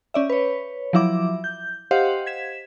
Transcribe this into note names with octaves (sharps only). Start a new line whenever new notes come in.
C#4 D5 E5
B4 C#5
F3 F#3 E4 E5 D6
G6
G4 C5 D#5 F5 F#5
G#6 B6 E7